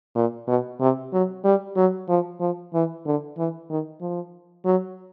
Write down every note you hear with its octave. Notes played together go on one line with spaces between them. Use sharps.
A#2
B2
C3
F#3
G3
F#3
F3
F3
E3
D3
E3
D#3
F3
F#3